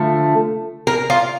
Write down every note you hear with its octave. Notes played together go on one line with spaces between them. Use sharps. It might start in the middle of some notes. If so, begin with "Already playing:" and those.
Already playing: D3 F3 A3
A#4
F4